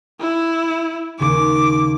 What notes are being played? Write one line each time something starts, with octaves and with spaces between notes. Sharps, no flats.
E4
D#2 C#3 D6